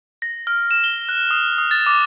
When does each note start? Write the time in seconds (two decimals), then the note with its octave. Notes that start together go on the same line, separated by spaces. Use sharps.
0.22 A#6
0.47 F6
0.71 E7
0.84 G7
1.09 F#6
1.31 D#6
1.58 D#6
1.71 A6
1.86 D6